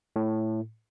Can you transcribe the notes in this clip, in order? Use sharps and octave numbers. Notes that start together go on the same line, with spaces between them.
A2